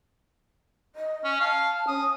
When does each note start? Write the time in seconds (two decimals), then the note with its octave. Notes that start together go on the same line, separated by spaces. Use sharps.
0.96 D#5
1.24 C#4
1.40 F5 A5
1.88 C#4 D#6